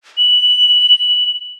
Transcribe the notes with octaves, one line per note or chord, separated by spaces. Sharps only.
F#7